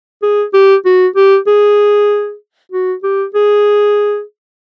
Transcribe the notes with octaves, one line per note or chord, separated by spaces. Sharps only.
G#4
G4
F#4
G4
G#4
F#4
G4
G#4